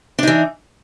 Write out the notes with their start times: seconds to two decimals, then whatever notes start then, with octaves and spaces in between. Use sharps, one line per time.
0.19 D4
0.23 D#4
0.27 E3